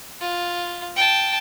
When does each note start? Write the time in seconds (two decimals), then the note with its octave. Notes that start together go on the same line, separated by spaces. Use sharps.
0.21 F4
0.96 G5 A5